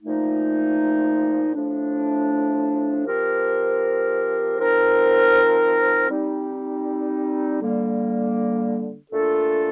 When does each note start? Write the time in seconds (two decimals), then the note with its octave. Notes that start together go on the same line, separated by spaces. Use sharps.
0.03 A#2 F3 A3 D#4
1.55 A2 F3 A3 D4
3.06 F3 C4 G4 A#4
4.57 F3 C4 D#4 A#4
6.09 G3 C4 D#4
7.61 D3 G3 A#3
9.12 A#2 A3 D4 F4 A4